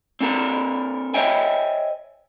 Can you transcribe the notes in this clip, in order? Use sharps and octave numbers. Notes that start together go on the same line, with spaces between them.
C4 D4 A4 A#4
C5 C#5 D#5 E5 G5 G#5